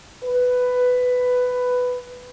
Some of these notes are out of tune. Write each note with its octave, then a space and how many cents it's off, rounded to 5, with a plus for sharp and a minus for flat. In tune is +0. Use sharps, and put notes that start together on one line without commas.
B4 +10